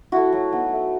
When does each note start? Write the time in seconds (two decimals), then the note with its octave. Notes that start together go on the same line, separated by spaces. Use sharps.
0.12 A3 E4 F#4
0.32 F#3
0.52 B3 D#4
0.73 A3